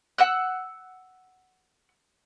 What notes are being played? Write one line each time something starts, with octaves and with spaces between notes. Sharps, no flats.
F#5 E6 F#6